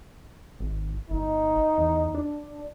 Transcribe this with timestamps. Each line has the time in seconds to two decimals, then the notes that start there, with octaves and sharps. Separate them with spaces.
0.60 G#1
1.10 G1 D#4
1.78 E2
2.15 D4